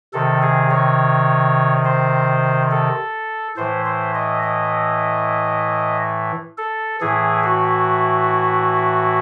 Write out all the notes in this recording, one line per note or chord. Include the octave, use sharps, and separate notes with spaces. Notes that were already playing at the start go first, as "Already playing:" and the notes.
C3 D#3 A4
G#4
C#5
C5
A4
A2 E3 C5
C5
D#5
D#5
A4
A2 E3 G#4
F#4